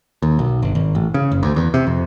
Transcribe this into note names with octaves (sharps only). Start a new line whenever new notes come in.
D#2
B1
G1
G#1
A1
C#3
F#1
D2
E2
C3
F2